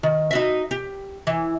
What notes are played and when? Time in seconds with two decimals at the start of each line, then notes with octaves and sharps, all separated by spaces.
0.03 D#3
0.31 D#4 F#4 E5
0.71 G4
1.27 E3